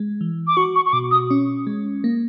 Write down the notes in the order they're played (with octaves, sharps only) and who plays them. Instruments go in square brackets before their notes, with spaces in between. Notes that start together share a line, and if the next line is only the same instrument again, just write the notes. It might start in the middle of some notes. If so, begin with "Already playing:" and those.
Already playing: [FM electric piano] G#3
E3
[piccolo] D6
[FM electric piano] F#4 [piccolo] C#6
[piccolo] C#6
C#6
[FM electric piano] B2 [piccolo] D6
[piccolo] D#6
[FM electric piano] C#4
G#3
A#3